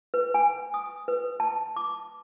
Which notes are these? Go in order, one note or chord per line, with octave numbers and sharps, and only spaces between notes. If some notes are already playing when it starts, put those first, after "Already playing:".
B4
G#5
D#6
B4
A5
D6